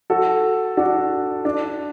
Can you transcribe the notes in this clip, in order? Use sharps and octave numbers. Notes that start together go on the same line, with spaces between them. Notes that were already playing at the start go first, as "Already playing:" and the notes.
F#4 A4
D4 F#4
D4